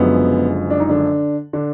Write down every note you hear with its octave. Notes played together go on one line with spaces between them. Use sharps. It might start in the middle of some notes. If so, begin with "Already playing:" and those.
Already playing: F#1 F#2 D3 F3 G#3 B3
D4
D#4
D3 D4
D3 D4